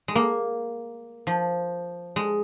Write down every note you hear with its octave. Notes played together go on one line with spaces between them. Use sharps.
G#3
A#3
F3
G#3